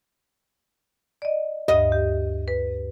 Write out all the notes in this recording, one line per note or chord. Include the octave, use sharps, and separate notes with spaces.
D5 D#5
D2 G2 D#5
G4
B4